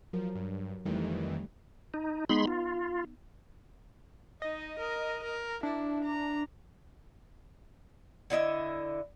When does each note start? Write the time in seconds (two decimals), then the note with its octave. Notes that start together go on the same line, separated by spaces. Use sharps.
0.13 F3 F#3 A#4
0.35 G2
0.85 F2 D#3 E3 G3 A3
1.94 D#4
2.29 G#3 B3 D#4 B5 C6
2.47 F4
4.42 D#4 D#5
4.79 A#4
5.23 A#4
5.63 D4 E4
6.04 A#5
8.30 D3 E4 D#5 E5